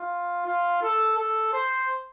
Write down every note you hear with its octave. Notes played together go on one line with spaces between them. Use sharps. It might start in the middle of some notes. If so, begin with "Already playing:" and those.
Already playing: F4
F4
A4
A4
C5